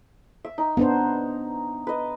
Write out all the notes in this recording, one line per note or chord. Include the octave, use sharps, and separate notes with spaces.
E5
D#4
B3 D4 C5 A#5
B4 D#5